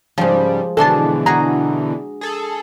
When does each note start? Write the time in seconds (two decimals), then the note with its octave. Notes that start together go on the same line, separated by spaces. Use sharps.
0.18 G#2 C#3 F3 G3 G#3
0.77 B2 D3 E3 G#3 D4 A4 A5 C6
1.26 F#4 G#4 A#5
2.21 G#4 A4